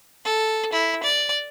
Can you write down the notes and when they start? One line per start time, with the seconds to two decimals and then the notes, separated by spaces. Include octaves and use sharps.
0.25 A4
0.73 E4
1.03 D5